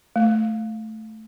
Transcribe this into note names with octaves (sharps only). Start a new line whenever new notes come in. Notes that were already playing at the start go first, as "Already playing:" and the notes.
A3